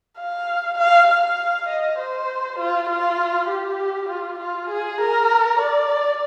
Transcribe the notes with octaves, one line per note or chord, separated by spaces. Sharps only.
F5
F5
F5
D#5
C5
F4
F4
G4
F4
F4
G#4
A#4
D5